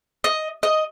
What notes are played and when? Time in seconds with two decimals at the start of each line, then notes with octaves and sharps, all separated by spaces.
0.24 D#5
0.63 D#5